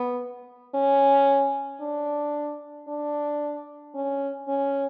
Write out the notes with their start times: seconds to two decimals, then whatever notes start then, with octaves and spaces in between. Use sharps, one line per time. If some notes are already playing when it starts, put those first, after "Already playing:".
Already playing: B3
0.75 C#4
1.81 D4
2.88 D4
3.95 C#4
4.48 C#4